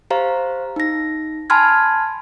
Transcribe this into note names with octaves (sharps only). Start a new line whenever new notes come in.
G4 C5 F5 A#5
D#4 A#6
G#5 A5 B5 C6 F6 G#6